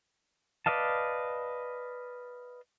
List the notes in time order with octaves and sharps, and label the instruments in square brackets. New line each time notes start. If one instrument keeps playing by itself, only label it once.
[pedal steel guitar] B4 D5 D#5 F5 A5